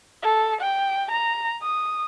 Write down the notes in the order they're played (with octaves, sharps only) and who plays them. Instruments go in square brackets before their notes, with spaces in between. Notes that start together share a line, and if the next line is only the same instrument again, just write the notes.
[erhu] A4
G5
A#5
D#6